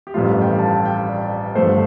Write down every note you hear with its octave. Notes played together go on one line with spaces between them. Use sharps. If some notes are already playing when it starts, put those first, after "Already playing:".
G4
A1 G2 F3 A3 F4
F4
G5
F5
A5
G5
G5
D5
G1 G2 F3 A3 C5